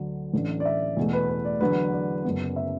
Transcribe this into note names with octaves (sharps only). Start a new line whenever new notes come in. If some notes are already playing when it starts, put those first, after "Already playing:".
Already playing: D2 D3 F#3 D4
A1 A2 E3 D4
D5
E5
E2 B2 A3
B4
B4
D5
E2 D3 F#3 D4 B4
D5
F#1 F#2 F#3 B3
E5